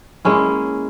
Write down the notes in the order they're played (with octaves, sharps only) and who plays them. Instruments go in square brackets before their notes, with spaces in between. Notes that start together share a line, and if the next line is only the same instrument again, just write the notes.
[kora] G#3 A#3 C#4 E4